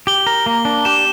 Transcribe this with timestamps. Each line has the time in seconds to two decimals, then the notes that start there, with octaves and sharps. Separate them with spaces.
0.07 G4 G7
0.27 A#4
0.46 A#3
0.65 D4
0.85 G4 E7